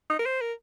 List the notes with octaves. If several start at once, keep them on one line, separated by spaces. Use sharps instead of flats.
D#4
A#4
C5
A#4